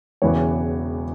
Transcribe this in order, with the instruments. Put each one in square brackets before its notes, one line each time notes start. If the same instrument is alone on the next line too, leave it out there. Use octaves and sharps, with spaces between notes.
[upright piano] E1 E2 C#3 E3 B3 C#5